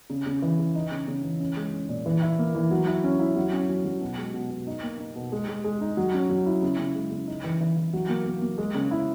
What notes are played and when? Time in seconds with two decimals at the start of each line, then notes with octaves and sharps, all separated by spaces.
0.10 C#3
0.26 C#3
0.42 E3
0.59 C#3
0.75 D#4
0.91 C#3
1.08 C#3
1.24 E3
1.40 C#4
1.56 G#3
1.73 C#4
1.89 A#2
2.06 E3
2.22 E4
2.39 A#3
2.55 E3
2.71 F#3
2.87 E4
3.04 C#4
3.20 E4
3.36 F#3
3.53 C#4
3.69 F#3
3.85 F#3
4.01 B2
4.18 G#3
4.34 B2
4.50 B2
4.67 D#4
4.83 A#3
4.99 D#4
5.15 B2
5.32 G#3
5.48 G#3
5.64 G#3
5.81 D#4
5.97 F#3
6.14 C#4
6.30 F#3
6.46 E4
6.62 C#3
6.78 C#3
6.95 G#3
7.11 C#3
7.27 D#4
7.44 E3
7.61 E3
7.77 E3
7.93 F#3
8.09 A#3
8.26 A#3
8.42 A#3
8.58 G#3
8.75 C#3
8.91 E4